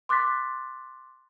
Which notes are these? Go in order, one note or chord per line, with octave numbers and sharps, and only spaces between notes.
C6 D6 F#6 A6 B6